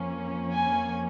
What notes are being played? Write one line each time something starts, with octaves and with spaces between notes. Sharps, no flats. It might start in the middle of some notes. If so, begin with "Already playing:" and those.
Already playing: F2 F3 A#3 C#4
G#5